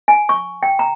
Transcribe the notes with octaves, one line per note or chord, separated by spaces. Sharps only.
G#5
C#6
G5
A#5